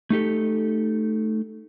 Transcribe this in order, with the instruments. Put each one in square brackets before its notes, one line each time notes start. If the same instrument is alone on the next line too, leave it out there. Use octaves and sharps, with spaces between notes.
[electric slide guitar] A3 D#4 G4 A4